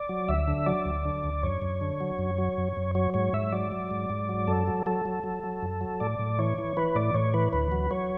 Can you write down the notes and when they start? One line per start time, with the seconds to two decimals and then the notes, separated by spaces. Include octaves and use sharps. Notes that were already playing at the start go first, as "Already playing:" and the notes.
Already playing: D5
0.09 F#3
0.28 D2 E5
0.48 D3
0.66 F#3 D5
0.86 D2
1.05 D3
1.24 D2
1.43 F#2 C#5
1.62 F#2
1.81 D3
2.01 F#3
2.19 F#2
2.38 F#3
2.58 F#2
2.77 F#2
2.95 F#3 C#5
3.14 G#2 C#5
3.33 G#2 E5
3.52 F#3 D5
3.72 F#3
3.91 G#2
4.10 G#2
4.29 F#3
4.48 F#2 A4
4.67 F#3
4.86 F#3 A4
5.05 F#3
5.24 F#3
5.43 F#3
5.62 F#2
5.81 F#3
6.00 A2 D5
6.19 A2
6.39 E3 C#5
6.58 E3
6.77 E3 B4
6.95 A2 D5
7.14 A2 C#5
7.34 E3 B4
7.53 D2 B4
7.72 F#3
7.91 F#3 C#5